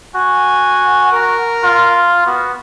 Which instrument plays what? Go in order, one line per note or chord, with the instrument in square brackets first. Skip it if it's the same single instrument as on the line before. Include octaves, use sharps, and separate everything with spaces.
[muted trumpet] F#4 [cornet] G#5
[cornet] A#4
[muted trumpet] F4
[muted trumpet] B3 [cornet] F#4